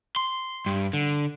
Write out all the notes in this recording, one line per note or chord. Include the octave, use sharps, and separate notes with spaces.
C6
G2
D3